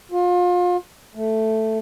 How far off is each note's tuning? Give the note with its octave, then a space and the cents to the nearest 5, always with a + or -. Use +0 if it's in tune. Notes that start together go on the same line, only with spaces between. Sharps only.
F4 +30
A3 +0